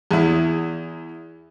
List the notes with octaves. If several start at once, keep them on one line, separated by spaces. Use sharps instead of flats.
E2 E4